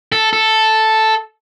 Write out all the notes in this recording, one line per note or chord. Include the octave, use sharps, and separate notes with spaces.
A4
A4